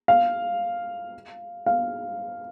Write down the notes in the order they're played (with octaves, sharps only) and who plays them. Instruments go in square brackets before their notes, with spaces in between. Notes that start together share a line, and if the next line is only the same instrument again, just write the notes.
[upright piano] F5
F5